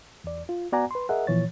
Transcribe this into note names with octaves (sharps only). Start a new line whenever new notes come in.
E2 D5
F4
B3 F#4 D5 F#5 G#5 A#5
B4 C6
G#4 A#4 D#5 E5 F#5
A#2 E3 F3 C#5 A6